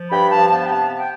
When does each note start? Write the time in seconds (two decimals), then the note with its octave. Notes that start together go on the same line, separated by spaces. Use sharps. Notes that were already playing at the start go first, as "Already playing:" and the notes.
Already playing: F3
0.11 G2 G5 B5
0.31 F3 F5 A5
0.50 B3 F5 A5
0.66 G5
0.70 C3 F5 A5
0.90 B3
0.98 G5